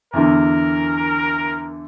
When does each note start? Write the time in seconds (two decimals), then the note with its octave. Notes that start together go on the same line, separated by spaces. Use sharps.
0.13 E2 D3 A#4